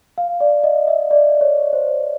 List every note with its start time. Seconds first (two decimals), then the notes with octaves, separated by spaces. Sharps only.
0.18 F5
0.40 D5
0.64 D#5
0.87 E5
1.11 D5
1.41 C#5
1.73 C5